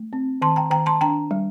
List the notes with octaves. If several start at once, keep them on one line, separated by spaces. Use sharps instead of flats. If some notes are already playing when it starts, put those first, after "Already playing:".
Already playing: A3
C4
D#3 A5 C6
G5 A#5
D#3 G5 A#5
A5 C6
D4 G5 A#5
G3